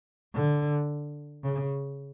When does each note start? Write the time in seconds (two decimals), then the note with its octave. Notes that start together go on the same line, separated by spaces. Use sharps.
0.35 D3
1.44 C#3